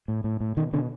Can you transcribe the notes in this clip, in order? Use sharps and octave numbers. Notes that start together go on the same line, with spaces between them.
A2
A2
A2
B2 D#3
B2 D3